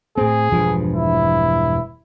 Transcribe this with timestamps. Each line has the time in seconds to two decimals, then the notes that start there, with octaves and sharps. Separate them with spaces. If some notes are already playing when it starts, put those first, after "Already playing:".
0.17 A2 C4 G#4
0.52 E1 G2 F3
0.94 E4